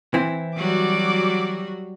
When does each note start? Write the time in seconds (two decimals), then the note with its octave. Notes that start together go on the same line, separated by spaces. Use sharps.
0.14 E3 C4 E4
0.57 F#3 G3 F#4 D6